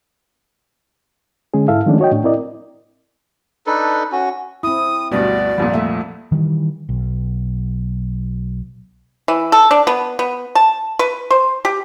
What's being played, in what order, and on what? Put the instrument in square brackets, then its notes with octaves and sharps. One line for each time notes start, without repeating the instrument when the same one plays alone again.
[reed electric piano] D3 G#3 C#4 G#4
G#2 E4 A4 E5 F5
D#3 F3 G#3 A3 C#4 D4
F#4 C#5 D#5 G5
A2 D4
C4 E4 A#4 D5 D#5
[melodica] D4 D#4 A4 B4
C#4 F#4
[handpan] C4 E4 [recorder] D#6
[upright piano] D2 G2 B2 [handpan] B3 [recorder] D5
[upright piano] C2 F2 A#2 [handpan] F3
[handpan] A3 E5
[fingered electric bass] D#3 E3 G3
B1
[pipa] E3
A4
D4
B3
B3
A5
B4
C5
G4